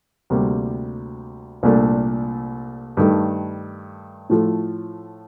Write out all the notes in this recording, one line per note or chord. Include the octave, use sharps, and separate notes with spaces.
D2 C3 G3 A#3
C2 A#2 A3 D4
G2 D#3 A3
A2 F3 A3